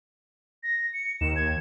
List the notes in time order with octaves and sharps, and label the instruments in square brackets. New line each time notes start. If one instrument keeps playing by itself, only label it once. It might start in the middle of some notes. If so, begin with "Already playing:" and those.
[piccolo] A#6
C#7
[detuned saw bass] D#2 [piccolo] E7
[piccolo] G#6